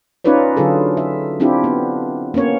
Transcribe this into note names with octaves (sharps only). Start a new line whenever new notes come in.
C#4 D#4 F4 B4 C#5 D5
D3 F#3 F4 G#4 A4
E5
C4 D4 E4 F4 G4
B3
A#3 B3 C#4 C#5